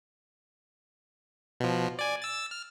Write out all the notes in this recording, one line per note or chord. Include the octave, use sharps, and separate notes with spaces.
B2 F3
D5 G#5
E6 A6
F6